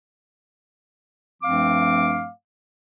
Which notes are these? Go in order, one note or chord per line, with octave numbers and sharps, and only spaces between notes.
G2 F3 A3 C4 F5 D6